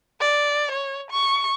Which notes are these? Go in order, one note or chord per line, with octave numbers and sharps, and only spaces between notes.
D5
C#5
C#6